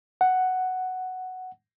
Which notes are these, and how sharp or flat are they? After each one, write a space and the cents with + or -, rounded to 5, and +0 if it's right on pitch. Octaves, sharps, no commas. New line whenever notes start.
F#5 +5